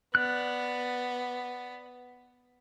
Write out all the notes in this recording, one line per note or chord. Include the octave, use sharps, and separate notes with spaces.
B3 D5 F#6